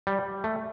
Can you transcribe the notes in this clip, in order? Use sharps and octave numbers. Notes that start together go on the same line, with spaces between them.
G3
A3